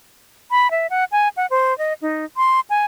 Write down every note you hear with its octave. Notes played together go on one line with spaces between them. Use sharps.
B5
E5
F#5
G#5
F#5
C5
D#5
D#4
C6
G#5